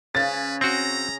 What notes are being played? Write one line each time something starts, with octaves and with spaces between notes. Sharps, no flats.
C#3 B4 A6
C4 F#4 A#5